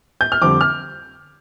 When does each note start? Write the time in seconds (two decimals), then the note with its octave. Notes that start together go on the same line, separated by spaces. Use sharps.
0.21 G6
0.32 F6
0.42 F2 D3 G3 C4 D6
0.61 F6